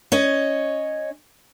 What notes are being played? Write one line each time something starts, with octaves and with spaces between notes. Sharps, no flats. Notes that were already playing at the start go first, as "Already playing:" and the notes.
C#4 C#5 D#5